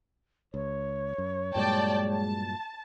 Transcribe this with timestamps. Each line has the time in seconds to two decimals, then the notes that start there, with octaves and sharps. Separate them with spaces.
0.54 C#2 C#5
1.18 F#2
1.55 G2 A#2 F#3 G#3 D5 G5 A5
2.11 A5